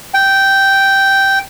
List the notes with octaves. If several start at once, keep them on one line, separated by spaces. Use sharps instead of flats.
G5